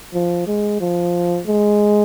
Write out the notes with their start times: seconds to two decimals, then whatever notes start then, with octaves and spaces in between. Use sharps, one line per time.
0.14 F3
0.47 G#3
0.80 F3
1.47 G#3